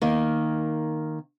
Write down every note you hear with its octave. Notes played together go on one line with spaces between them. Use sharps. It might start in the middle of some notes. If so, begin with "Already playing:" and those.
D#3 A#3